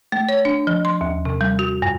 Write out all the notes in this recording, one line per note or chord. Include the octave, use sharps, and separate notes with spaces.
A3
C#5
D4
F3
C6
D#2
C3
G3
F#4
G2